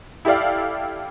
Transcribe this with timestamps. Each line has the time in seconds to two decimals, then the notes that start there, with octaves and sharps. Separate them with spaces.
0.25 E4 G4 A4 D5 F5